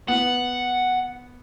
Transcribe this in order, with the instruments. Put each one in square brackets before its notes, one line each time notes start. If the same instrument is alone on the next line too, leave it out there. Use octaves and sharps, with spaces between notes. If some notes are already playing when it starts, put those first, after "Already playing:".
[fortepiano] B3 [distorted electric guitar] F#5